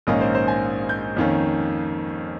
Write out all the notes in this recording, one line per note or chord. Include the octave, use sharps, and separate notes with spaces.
A#1 G#2 D#3 A#3 C#4 D#5
C5
C5
G#5
G6
F2 D#3 A#3 C#4